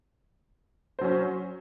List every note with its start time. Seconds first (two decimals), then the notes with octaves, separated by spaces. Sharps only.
0.99 C5
1.01 F#3
1.04 C#4